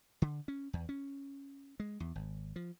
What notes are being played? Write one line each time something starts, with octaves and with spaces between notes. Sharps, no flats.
D3
C#4
E2
C#4
G#3
E2
G#1
F3